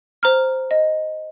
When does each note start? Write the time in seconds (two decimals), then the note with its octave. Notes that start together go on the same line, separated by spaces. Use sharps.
0.23 C5 A#5 F6
0.71 D#5